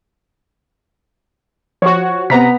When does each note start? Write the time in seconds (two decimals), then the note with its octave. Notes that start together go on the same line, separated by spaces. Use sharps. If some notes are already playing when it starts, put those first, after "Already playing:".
1.82 F3 F#4 C#5 C#6
2.30 C3 B3 A#5 B6